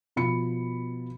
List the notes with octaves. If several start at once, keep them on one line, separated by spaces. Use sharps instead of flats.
B2 F3 B5 C#7